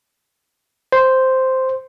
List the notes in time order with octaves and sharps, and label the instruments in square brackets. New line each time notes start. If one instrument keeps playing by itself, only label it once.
[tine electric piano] C5